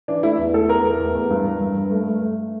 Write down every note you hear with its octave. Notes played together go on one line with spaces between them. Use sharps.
E3 D4
A3 E4
E2
A3 A4
E2 A#4
A3
E2
E2
G2
G2
G2
G2
A3
A3
A3